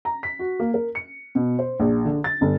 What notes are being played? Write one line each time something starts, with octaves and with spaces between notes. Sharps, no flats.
A#5
B6
F#4
A#3
A#4
C#7
B2
C5
A#1
D3
A6
G1